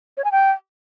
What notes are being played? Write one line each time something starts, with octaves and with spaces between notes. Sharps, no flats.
C#5
G#5
G5